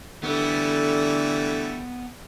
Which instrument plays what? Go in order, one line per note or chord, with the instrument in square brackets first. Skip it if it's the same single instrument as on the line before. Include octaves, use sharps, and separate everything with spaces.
[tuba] D3 [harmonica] E3 G3 A3 [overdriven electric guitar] B3